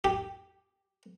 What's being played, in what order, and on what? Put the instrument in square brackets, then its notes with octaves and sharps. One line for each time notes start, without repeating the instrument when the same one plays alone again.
[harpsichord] G4